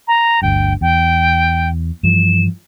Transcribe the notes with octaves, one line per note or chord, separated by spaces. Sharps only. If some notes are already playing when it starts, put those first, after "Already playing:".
A#5
G1 D2 G2 G5
E2 G5
G2 E3 F3 E7